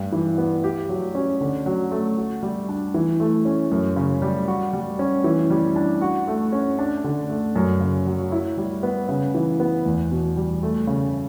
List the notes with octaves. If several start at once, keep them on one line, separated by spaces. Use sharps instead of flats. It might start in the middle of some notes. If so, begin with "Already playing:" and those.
Already playing: G2
E3
B3
G4
F#3
C#4
D3
F#3
A3
F#4
G3
D4
E3
A3
C#4
F#2
C#3
G3
F#4
G3
C#4
E3
G3
D4
F#4
A3
C#4
D4
D3
A3
F#2
C#3
F#3
E4
G3
B3
C#3
E3
B3
E2
B2
G3
A3
C#3